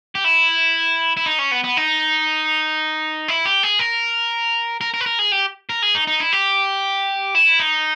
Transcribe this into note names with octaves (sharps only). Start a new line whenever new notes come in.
G4
E4
E4
D#4
C#4
B3
B3
D#4
E4
G4
G#4
A#4
A#4
A#4
B4
A#4
G#4
G4
A#4
G#4
D#4
D#4
E4
G4
E4
D#4